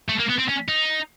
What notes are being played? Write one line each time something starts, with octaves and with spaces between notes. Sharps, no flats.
A3
A#3
B3
C4
C#4
D#4